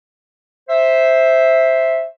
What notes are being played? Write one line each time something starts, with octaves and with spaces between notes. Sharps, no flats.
C5 E5